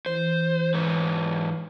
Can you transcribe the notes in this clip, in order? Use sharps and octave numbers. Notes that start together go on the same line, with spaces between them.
E3 C5
G#2 B4 C#5